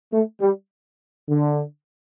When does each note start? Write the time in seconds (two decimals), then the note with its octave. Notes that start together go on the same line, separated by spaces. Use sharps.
0.12 A3
0.41 G3
1.27 D3